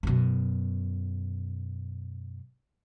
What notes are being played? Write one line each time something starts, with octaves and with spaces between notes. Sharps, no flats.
F#2 B2